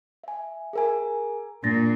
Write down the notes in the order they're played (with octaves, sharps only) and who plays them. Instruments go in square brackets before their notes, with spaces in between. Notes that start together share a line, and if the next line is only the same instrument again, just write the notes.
[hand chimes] E5 G#5
G#4 A#4 G#5
[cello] A#2 [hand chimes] D4 A6 A#6